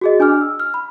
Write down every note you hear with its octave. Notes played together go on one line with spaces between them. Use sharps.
F#4 G#4 D#5
D4 G#5 D6 F6
E6
F6
B5